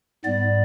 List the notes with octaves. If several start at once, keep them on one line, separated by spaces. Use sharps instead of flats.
G#2 G3 B3 D5